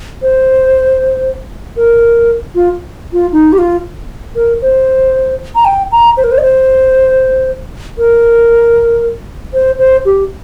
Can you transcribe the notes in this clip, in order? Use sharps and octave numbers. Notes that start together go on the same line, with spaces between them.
C5
A#4
F4
F4
D#4
G4
F4
A#4
C5
A#5
G5
A#5
C5
A#4
C5
D#5
C5
A#4
C5
C5
G4